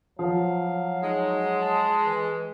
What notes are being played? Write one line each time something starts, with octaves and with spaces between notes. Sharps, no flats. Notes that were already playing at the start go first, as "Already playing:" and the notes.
F3 F#3 F5
G#3 D#4
A5
E3